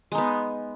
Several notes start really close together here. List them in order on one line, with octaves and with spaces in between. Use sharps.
G#3 D#4 B3